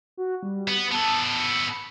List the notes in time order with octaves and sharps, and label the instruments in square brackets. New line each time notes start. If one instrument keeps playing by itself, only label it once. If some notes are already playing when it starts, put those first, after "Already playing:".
[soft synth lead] F#4
G3
[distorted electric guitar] B3
[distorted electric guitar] B3 A4 [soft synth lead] A5
[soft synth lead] C#7